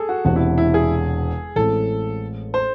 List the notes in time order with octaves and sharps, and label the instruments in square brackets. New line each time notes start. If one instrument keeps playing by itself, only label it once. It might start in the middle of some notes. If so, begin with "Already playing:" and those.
Already playing: [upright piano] G#4 A4
F#4
[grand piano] E1 E2 C3 [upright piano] F#4
[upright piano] E4
E4
G#4
[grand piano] A1 A2 G#3 C4 [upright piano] A4
[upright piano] C5